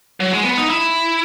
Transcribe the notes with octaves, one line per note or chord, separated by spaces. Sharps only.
F#3
G#3
B3
D#4
E4